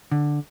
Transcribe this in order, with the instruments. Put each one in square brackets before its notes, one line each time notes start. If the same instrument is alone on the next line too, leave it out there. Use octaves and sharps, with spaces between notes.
[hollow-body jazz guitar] D3